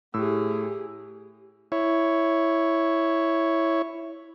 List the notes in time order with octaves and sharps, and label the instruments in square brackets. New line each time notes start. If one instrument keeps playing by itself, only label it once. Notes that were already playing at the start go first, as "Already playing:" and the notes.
[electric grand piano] A2 E6 [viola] G4 G#4
[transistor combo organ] E4 C#5